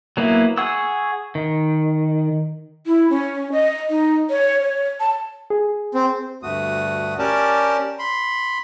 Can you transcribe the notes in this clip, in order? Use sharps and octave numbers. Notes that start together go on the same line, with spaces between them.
F#3 A#3 B3 E4
G#4 F#5 C#6 E6
D#3
E4
C#4
D#5
D#4
C#5
C#5
A5
G#4
C4
D2 G2 A3 F#4 D#6
C#4 G4 A#4 D5 A5
B5 C6